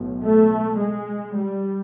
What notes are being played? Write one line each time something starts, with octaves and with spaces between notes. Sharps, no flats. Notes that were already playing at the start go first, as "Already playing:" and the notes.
Already playing: B1 A2
A3
G#3
G3